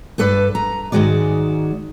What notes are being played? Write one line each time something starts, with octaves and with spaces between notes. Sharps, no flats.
G2 A4 B4 D5
A#5
G#2 D#3 F3 G#3 F#4 D5